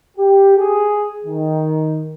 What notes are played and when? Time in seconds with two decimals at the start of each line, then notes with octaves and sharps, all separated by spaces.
0.16 G4
0.56 G#4
1.24 D#3